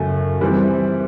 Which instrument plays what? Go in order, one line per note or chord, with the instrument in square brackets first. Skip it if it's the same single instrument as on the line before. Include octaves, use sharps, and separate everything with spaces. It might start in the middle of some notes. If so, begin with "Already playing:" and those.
Already playing: [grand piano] F#2 C#3 F#3 A3
E3 G3 C4